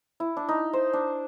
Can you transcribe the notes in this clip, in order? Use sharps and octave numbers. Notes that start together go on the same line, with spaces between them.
E4
D4
D#4
C5
D4